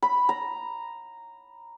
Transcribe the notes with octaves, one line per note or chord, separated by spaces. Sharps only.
B5
A#5